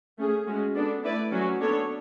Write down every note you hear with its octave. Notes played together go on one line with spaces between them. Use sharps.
A3 C#4 G#4
G#3 C#4 F#4
B3 D4 A4 D5
A3 E4 B4 D5
F#3 C#4 F#4
B3 D4 A4 C#5